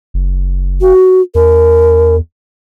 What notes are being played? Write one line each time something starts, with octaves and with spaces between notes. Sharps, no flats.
F#1
F#4
E2 A#4